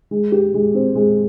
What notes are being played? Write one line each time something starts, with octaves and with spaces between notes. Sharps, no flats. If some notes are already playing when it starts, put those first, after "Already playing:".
G#3
G4
G#3
C4
G#3